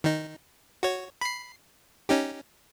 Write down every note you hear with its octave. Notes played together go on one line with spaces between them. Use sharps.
D#3 D#4
F#4 C#5
B5 C7
C#4 D#4 G4